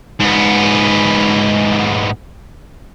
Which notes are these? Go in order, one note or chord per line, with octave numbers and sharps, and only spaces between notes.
G#2 B3